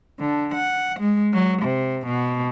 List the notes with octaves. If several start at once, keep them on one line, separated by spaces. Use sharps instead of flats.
D3
F#5
G#3
F#3
C3
B2